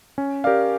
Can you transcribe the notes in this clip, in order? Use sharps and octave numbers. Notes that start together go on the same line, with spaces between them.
C#4
G4 A#4 D5 F5